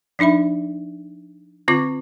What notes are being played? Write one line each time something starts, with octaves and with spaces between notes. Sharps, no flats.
F3 D4 D#4 E5 B5
D3 C4 F4 D6